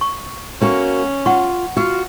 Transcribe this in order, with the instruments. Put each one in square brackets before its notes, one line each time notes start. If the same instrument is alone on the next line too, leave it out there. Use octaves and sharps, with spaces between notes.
[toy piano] C#6
[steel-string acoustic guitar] A#3 F#4 [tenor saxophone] C#4
[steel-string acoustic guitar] F4 [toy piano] F#5 C#6
[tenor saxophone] F4 [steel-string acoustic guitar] F#4